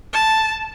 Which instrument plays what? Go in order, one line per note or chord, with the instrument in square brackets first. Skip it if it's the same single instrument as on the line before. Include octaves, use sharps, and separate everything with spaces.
[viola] A5